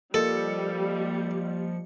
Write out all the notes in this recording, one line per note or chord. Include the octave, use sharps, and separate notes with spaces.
F3 G3 A#3 A4 D#5 C#7